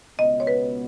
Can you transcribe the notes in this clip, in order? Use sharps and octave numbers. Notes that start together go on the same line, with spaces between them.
C#2 B2 B3 D#5
C#5
B4